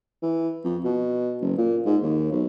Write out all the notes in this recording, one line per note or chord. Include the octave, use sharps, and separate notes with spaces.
E3
F2
B2
F#1
A#2
G#2
D#2
B1